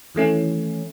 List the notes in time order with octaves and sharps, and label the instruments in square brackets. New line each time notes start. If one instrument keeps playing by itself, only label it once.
[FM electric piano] D#3 E3 A3 C#4